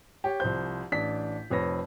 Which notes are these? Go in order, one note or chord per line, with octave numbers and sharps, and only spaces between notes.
G4 C#5
C2 F3 C5 G6
A1 D4 B6
F1 F2 B4 C#5 B5 A#6